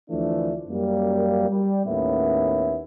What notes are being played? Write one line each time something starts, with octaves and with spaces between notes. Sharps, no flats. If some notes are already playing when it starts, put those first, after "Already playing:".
D2 E3 F3 A3 D4
F#2 G3 A#3
G3
D#2 A2 A#3 B3 C#4 E4